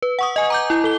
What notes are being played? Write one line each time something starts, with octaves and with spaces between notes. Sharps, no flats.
B4
F#5 C#6 D#6
D#5 G#5
A#5 D6 G6
E4
A4 G7